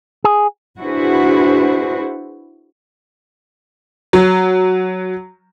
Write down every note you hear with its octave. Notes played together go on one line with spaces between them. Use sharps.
G#4
D4 E4 F#4 G#4 B4 C5
F#3